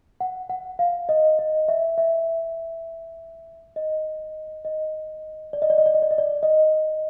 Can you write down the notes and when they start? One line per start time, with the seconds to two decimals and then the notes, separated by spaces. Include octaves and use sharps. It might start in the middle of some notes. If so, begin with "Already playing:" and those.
0.20 F#5
0.50 F#5
0.79 F5
1.09 D#5
1.39 D#5
1.68 E5
1.98 E5
3.76 D#5
4.65 D#5
5.53 D5
5.62 D#5
5.70 D5
5.78 D#5
5.86 D5
5.94 D#5
6.02 D5
6.11 D#5
6.18 D5
6.43 D#5